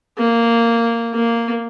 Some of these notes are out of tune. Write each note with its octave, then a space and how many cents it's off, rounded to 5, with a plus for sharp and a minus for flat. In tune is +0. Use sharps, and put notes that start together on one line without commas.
A#3 -10
A#3 -5